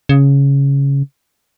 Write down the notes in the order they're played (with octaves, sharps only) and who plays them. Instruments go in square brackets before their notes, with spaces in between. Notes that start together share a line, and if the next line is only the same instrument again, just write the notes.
[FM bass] C#3